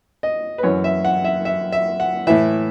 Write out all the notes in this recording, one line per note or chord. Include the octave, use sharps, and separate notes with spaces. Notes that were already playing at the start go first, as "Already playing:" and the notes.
D#5
B4
F#2 E3 C#5
E5
F#5
E5
E5
E5
F#5
A2 E3 E5